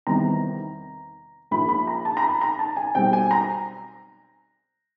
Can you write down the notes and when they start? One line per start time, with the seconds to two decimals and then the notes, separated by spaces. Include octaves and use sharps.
0.07 E2 C3 D#3 G3 B3 A#5
1.51 A#1 A#2 F3 B5
1.69 B5
1.87 A#5
2.05 A5
2.17 A#5
2.23 B5
2.41 A#5
2.59 A5
2.77 G#5
2.95 B1 B2 G3 C4 G5
3.13 G#5
3.31 A#5